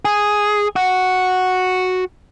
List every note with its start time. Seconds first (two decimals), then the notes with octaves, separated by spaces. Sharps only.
0.05 G#4
0.76 F#4